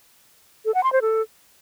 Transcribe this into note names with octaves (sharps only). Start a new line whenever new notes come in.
A4
F#5
C6
C5
A4